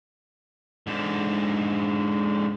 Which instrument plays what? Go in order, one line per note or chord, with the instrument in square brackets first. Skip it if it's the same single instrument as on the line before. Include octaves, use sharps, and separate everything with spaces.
[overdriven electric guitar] G#2 D3